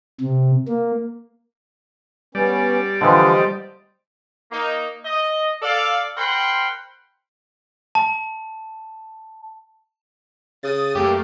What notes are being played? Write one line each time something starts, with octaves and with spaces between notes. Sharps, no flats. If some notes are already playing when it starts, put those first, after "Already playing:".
C3
A#3
G3 B3 C#4 D5
D3 E3 F3 G4 C5 D#5
A#3 D#4
D#5
A4 D5 F5
A#4 C5 F#5 G5 B5 C6
A5
C#3 D#6 A6
F#2 A3 A#3 G4